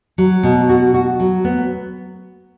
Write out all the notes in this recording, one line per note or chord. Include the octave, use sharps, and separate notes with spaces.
F#3
B2
F#4
F#4
F#3
B3